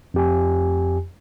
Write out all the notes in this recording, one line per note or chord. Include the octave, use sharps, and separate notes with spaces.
F2 G4 G#5